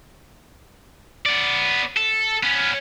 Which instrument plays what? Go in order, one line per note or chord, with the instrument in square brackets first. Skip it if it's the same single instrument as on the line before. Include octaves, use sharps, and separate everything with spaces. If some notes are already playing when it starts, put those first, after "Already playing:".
[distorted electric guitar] B3 D5
A4
B3 C#4